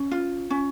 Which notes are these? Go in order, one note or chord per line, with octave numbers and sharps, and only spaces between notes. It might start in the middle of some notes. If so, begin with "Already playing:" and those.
Already playing: C#4
F4
C#4